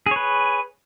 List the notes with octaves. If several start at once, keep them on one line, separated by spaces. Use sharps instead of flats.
G#4 B4 C#5